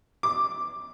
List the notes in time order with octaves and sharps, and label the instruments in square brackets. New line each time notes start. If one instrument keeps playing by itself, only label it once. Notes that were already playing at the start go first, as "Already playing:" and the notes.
[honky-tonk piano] D6